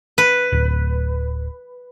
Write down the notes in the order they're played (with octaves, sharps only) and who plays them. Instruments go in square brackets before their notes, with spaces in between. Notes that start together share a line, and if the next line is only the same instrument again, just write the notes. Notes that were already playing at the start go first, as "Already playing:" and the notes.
[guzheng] B4
[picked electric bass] D1